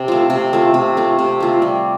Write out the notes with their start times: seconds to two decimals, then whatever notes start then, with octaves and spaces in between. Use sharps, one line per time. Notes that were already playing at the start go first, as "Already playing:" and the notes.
Already playing: C3
0.08 A3 F4
0.30 C3
0.53 A3 F4
0.74 C3
0.97 A3 F4
1.19 C3
1.40 A3 F4
1.62 G3